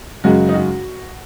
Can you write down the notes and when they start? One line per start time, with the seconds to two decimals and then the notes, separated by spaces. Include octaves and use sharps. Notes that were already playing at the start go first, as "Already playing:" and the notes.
0.24 F#2 C#3 G#3 F#4
0.49 D#4
0.54 F#4